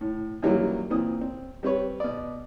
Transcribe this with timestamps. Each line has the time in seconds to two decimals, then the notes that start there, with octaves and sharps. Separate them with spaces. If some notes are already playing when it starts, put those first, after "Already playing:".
0.01 A2
0.43 F#2 D#3 E3 F#3 G3 A#3
0.90 A#2 E3 C4 D#6
1.21 C4
1.63 G3 C4 B4 C#5
2.00 B2 D5